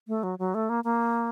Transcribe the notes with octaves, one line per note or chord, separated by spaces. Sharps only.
A3
F#3
F#3
A3
A#3
A#3